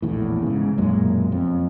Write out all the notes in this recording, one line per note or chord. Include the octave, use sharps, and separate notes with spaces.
A#1 E2 A2
G#2 C#3
B1 F#2 A#2 G#3
F2